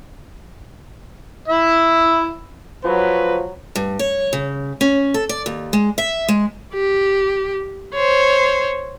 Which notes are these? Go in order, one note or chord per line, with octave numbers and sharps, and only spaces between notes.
E4 E5
F3 F#3 B4
G2
C#5
C#3
C#4
A4
D5
D#2
G#3
E5
G#3
G4
C5 C#5